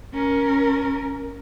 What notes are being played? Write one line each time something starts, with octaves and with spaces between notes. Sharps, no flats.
C#4 A#4